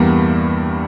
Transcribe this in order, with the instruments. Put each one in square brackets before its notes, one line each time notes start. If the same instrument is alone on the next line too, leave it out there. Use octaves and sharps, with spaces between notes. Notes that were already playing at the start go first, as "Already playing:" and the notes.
Already playing: [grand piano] E2 [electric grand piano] G2 G3 A#3